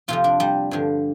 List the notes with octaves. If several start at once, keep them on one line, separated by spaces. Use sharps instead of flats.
F2 C3 F3 F4
D4
G3
G2 D3 F3